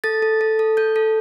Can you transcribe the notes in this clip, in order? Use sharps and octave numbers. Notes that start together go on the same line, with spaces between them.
A4 A6
A4
A4
A4
A4 G6
A4